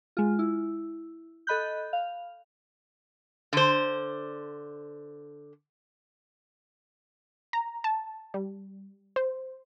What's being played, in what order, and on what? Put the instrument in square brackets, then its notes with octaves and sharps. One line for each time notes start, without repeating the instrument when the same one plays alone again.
[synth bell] G#3 F4
E4
A4 D#5 B5 F#6 G6
F5
[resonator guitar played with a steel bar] D3 C5
[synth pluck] A#5
A5
G3
C5